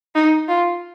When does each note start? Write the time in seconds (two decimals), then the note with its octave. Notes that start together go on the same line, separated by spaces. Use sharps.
0.15 D#4
0.48 F4